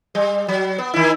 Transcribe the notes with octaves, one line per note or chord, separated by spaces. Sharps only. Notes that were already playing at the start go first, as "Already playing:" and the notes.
G3
F#3
B3
D#3 E4